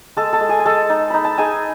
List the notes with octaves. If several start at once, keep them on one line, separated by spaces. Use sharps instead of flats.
G#3 A4 A5
A4 A5
G#3
G#4 G#5
G#5
G#3 A4 A5
D#4
D#4 B5
A5
D#4 G#4 G#5